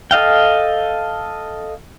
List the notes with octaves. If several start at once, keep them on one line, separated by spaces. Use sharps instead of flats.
A4 D#5 F5 G5